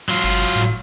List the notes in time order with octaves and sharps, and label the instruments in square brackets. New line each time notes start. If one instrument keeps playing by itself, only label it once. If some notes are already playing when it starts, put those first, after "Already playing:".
[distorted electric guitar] F#3 F4
[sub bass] G1
A2